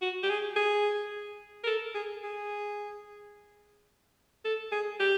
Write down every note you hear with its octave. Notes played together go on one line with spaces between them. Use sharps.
F#4
G4
G#4
G#4
A#4
A4
G#4
G#4
A4
G#4
G4